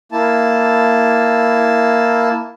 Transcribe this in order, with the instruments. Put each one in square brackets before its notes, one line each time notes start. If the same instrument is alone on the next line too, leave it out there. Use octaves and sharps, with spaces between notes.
[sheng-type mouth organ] A#3 E4 A5